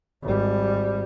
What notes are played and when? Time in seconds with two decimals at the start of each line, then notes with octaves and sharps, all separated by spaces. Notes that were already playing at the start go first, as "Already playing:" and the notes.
0.23 G#1 G3